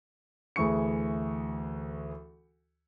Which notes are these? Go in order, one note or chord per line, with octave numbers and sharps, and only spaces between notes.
D2 E3 G#4 C#6 C#7